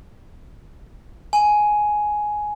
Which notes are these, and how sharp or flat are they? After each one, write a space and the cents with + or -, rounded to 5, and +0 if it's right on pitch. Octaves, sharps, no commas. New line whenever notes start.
G#5 +10